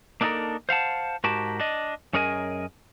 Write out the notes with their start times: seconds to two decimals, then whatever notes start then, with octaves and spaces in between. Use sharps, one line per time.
0.21 A#3 D4 D#4 F#4 A4 A#4
0.69 C5 F5 F#5 A5
1.24 G#2 F#4 G4 A#4 A5
1.60 D4 D#5
2.13 F#2 C#4 G#4 A#4 D#5 G#5